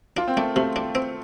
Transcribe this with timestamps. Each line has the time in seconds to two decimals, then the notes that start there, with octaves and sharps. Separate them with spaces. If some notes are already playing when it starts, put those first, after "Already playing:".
0.17 D4 F4
0.28 C4
0.37 A3 D4
0.56 C3 A3
0.76 D4
0.95 C4